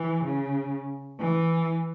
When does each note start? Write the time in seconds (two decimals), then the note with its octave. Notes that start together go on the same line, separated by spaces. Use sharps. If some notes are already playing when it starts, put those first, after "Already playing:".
Already playing: E3
0.25 C#3
1.20 E3